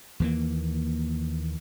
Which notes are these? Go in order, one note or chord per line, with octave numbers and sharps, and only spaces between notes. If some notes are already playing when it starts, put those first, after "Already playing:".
D#2 E3 A#3